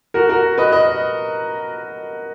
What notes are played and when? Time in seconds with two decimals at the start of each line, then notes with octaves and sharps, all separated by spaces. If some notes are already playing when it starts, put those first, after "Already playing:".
0.14 F#4 A#4
0.29 F#4 A#4
0.58 B4 D#5
0.71 B4 D#5